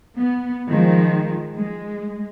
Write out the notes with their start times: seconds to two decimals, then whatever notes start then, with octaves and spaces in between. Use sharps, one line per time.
0.17 B3
0.69 D#3 F3 G#3
1.56 G#3